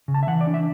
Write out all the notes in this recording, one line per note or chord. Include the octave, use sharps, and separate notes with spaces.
C#3
A5
E5
E3 F#5
D5
D4
E5